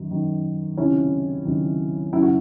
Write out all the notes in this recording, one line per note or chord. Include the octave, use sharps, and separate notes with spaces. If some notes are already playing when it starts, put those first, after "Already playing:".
Already playing: F#2 D#3 F#3
F#2 D#3 F#3
C#2 C3 D#3 F#3 C#4 E4
C#2 C3 D#3 F#3
F#2 C#3 F#3 E4
F#4